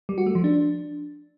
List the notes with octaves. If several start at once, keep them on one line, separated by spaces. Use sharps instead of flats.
G3
F#4
A3
F3
D4